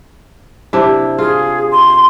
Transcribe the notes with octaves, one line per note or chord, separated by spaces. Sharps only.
C3 D4 E4
F4 G#4
C6